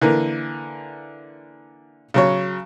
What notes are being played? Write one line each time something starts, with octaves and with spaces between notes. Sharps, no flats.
D3 E3 A#3
C#3 F#3 C#5